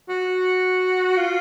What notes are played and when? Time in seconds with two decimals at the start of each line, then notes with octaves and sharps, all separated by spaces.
0.09 F#4
1.17 F4